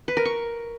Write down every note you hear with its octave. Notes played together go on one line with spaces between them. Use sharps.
B4
A#4
C#6